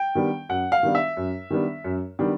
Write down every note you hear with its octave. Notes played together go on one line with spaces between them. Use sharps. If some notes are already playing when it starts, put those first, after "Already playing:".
Already playing: G5
D#3 G3 B3 D4
F#2 F#5
F5
D#3 G3 B3 D4
E5
F#2
D#3 G3 B3 D4
F#2
D#3 G3 B3 D4